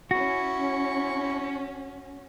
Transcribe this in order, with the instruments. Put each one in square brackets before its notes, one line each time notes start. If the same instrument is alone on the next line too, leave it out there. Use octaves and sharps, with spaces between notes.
[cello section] C#4 [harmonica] E4 C#6 [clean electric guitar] F#4